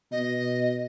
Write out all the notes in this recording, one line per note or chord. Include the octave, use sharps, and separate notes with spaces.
B2 D#5